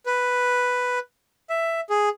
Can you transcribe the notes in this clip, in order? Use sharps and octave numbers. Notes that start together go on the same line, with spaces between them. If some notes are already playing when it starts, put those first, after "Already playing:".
B4
E5
G#4